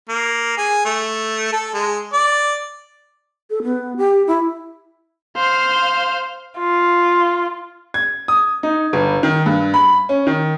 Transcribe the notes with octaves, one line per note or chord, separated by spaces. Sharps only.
A#3
G#4
A3
A4
G#3
D5
A4
B3
G4
E4
C5 F5
F4
G#6
D#6
D#4
G1
D#3
G2
B5
C#4
D#3